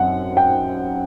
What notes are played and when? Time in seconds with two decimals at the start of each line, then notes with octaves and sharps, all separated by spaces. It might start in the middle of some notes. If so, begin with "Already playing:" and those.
Already playing: F#2 C4 F#5
0.37 G5